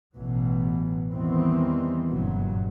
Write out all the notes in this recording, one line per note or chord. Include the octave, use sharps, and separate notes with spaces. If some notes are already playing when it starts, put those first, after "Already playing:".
A1 B2 E3 F#3
E2 D#3 E3 G3 B3 C4
F#1 G2 A#2 F#3